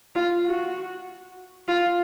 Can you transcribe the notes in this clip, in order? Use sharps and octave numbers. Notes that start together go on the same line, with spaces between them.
F4
F#4
F4